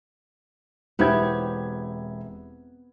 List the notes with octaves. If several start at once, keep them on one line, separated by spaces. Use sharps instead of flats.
E1 B3 C4 E4 G4 G#6